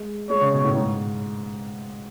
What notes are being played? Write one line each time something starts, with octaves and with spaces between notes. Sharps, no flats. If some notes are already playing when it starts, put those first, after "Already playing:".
Already playing: G#3
G#3 C#5
C#3
B2
A2
G#2